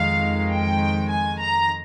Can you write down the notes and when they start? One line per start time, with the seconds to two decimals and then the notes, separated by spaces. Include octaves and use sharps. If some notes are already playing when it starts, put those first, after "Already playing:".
Already playing: F2 D#3 G#3 F5
0.51 G5
1.09 G#5
1.39 A#5